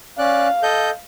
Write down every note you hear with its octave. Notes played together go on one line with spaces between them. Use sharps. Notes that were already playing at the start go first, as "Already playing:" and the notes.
C#4 D5 F5 F#6
A4 D#5 G6